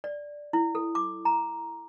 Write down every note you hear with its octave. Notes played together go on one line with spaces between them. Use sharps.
D5
E4
A4
D6
A#5